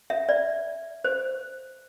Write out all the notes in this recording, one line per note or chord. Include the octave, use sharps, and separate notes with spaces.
E5
D5
C5